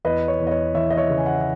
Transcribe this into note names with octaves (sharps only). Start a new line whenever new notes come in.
E2 B4 D#5
C#5
E2
D#5
C#5
E3 C#5 E5
D#5
C#5 E5
C#3
G#5
F#5
E5